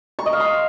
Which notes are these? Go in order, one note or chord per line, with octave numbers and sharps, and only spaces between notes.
C#6
D#5
F5
C6